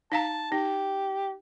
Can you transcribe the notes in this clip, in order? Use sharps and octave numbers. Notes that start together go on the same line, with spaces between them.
D#4 F5 A5 A#5
D#4 G4